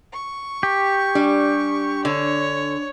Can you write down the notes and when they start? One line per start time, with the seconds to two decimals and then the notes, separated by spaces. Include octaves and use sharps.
0.13 C#6
0.63 G4
1.15 G3 D4
2.05 D3 C#5